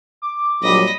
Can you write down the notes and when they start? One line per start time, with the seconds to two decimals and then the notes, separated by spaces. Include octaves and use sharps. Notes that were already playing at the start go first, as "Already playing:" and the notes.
0.22 D6
0.62 A#1 F#3 G3 D#5 B5